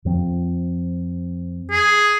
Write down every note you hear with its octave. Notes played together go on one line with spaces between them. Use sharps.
F2 F3 C4
G#4